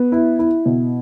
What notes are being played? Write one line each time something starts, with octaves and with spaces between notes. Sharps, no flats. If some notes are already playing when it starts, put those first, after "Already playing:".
Already playing: B3
E4
E4
B2